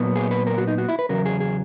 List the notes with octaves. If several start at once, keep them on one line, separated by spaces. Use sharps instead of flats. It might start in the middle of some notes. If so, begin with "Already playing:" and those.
Already playing: A#2 F#3 B3
G#4
B4
A#4
F#4
D#4
F#4
E4
B4
E2 C#3 F#3 A#4
G#4
G#4